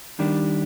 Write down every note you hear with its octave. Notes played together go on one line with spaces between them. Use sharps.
D#2 D#3 G3 D4